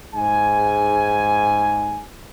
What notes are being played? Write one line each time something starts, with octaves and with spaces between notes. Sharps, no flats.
G#2 G#5